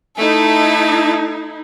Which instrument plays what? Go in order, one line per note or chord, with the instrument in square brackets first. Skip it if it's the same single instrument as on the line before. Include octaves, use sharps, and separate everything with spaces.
[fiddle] A3 A4 [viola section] D#4 E4